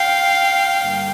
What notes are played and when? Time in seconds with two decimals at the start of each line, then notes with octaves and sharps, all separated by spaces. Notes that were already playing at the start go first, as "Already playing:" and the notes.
Already playing: F5 G5
0.82 G2 D3 G3 A#3